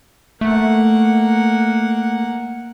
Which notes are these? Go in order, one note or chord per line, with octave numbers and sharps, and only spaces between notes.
A3 A#3 F#5